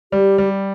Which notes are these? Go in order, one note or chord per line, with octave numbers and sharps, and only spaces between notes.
G3 G4
G3